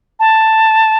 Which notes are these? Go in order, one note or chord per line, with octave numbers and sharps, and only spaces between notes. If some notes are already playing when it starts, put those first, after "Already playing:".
A5